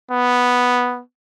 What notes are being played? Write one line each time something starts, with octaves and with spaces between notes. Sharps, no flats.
B3